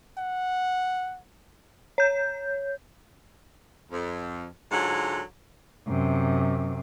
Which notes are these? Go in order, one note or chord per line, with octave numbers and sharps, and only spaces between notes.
F#5
C#5 G6
F2
G#2 D3 F#3 G#3 F4 F#5
F#2 C3